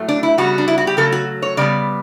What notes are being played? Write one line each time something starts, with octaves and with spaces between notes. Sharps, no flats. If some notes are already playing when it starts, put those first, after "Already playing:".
Already playing: A2 F#3 A3
D4
E4
C#3 G3 B3 F#4
D4
E4
F#4
G4
C#3 F#3 A3 A4
F#4
C#5
C#3 G3 B3 D5